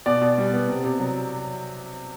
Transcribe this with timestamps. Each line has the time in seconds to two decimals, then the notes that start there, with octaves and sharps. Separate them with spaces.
0.06 B2 D5
0.21 B2
0.38 G3
0.53 B3
0.68 C3
0.84 C3
1.00 F#3